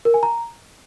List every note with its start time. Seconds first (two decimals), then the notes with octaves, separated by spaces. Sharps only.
0.05 A#4
0.14 G#5
0.23 A#5